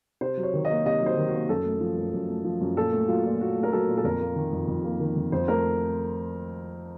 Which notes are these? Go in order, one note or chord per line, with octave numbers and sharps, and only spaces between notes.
C3 C5
F#3
C#5
D#3
D#5
A#3
C3 D#5
F#3 C5
D#3
F#4
A#3
F#2 A4
A3
F3
F#2
F#2
A3
F3
F#2
A#2 A4
A3
F#3 F4
A#2
A#2 F#4
A3
A#4
F#3 A4
A#2
A4
F2 A#4
A#3
D#3
F2
F2
A#3
D#3
F2
F2 C5
A3 A#4